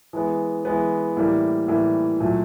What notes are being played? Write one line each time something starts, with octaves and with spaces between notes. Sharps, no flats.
E3 G#3 B3
E3 G#3 B3
A2 E3 G3 A#3
A2 E3 G3 A#3
A#2 F#3 A3